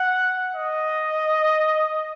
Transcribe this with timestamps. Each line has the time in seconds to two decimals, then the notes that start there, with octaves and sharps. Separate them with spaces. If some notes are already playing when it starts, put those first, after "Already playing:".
Already playing: F#5
0.55 D#5